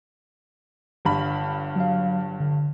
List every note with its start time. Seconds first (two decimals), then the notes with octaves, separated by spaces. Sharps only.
1.05 G1 G2 B5
1.76 F#3 F5
2.40 D3